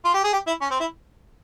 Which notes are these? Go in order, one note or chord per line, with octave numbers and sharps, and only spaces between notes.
F4
G4
G#4
G4
E4
C#4
C4
E4